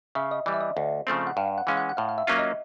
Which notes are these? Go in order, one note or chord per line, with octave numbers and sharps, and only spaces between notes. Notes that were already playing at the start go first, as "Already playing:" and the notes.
C#3 E5
D#5
E3 G3 D5
E5
D#5
D2
C#3 F3 A3 C4
F#5
G2 F5
F#5
E3 G#3 C#4 F5
F#5
F#5
A2 F5
F5
E5
F#3 A#3 C#4 F4
D#5